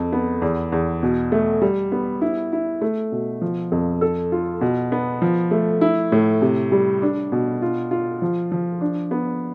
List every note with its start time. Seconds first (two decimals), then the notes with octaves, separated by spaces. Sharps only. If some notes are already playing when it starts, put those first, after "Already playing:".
Already playing: F2
0.13 B3
0.42 E2
0.72 E2
1.03 B2
1.32 A3
1.62 G3
1.92 B3
2.22 E4
2.53 E4
2.81 A3
3.12 B2
3.42 F3
3.72 F2
4.01 A4
4.32 F4
4.61 B2
4.92 B3
5.22 F3
5.51 A3
5.81 E4
6.12 A2
6.42 C3
6.72 G3
7.02 D4
7.32 B2
7.62 F4
7.91 F4
8.22 F3
8.52 F3
8.81 D4
9.11 B3